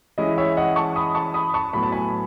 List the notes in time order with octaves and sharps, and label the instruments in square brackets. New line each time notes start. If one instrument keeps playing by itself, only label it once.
[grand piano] E3 G#3 C#4 E4 D#5
C#5 E5
D#5 F#5
A5 C#6
B5 D#6
A5 C#6
B5 D#6
A5 C#6
A2 F#3 B3 B5
A5
G#5 B5